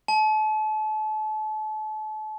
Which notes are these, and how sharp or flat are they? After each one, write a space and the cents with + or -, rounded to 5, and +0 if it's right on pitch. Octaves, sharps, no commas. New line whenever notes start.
A5 -35